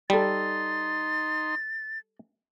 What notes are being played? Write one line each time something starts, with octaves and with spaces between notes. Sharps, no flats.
G3 D#4 A4 D5 C6 A6